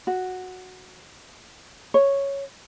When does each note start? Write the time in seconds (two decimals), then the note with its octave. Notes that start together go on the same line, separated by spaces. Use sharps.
0.07 F#4
1.94 C#5